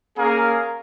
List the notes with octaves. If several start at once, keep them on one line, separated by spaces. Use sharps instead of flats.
A#3 C#4 G#4 A#4 F5